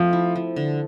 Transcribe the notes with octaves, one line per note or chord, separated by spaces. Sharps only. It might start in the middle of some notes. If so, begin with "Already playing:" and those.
Already playing: F3 A3 C4
E4
F3
D3